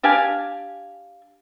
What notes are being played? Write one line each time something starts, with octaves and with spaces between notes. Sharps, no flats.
D4 G4 F5 G#5